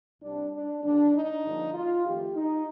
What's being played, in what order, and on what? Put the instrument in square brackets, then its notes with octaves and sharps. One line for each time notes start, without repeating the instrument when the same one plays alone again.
[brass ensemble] C2 C3 G3 D4
D4
D#2 D3 G3 D4
D#4
G2 D3 F3 A#3
F4
F2 D#3 A3 G4
D#4